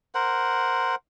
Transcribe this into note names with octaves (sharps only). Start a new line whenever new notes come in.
A#4 C5 F#5